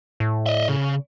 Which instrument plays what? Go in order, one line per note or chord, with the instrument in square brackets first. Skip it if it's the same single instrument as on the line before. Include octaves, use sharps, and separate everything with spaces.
[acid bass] A2
[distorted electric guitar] D#5 E5
C#3